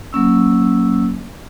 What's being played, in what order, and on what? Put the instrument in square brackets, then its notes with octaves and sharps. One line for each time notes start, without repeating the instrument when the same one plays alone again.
[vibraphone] F#3 A#3 C#4 E6